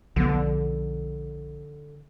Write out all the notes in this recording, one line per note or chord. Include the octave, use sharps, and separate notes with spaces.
B1 D3 F3 B3